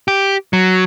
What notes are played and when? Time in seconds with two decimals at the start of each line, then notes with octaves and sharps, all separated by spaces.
0.08 G4
0.53 F#3